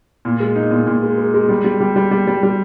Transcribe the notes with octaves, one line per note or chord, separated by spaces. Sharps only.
A#2
G#3
D#4
A#2
A#2
G#3
G#3
G#3
G3
G3
G3
G3
G3
G3
G3